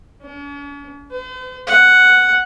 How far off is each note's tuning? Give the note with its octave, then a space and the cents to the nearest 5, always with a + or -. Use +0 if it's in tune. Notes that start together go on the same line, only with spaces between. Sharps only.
C#4 +45
C5 -45
F#5 +0